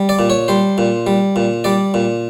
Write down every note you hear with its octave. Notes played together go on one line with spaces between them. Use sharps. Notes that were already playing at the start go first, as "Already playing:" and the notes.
Already playing: G3
D5
A#2
C#5
G3 C5
A#2
G3
A#2
G3 D5
A#2